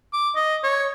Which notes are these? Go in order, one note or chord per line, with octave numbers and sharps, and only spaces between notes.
D6
D#5
C#5